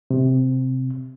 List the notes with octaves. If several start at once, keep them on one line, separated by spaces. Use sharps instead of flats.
C3